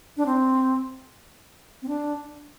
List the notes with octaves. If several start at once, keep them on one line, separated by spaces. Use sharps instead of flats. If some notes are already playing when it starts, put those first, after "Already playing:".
D4
C4
C4
D4